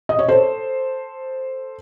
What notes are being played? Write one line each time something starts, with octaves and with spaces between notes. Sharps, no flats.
D#5
C#5
A4 C5